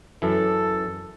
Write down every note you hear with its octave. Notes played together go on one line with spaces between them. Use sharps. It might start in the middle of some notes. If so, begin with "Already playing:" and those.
F#2 E3 A4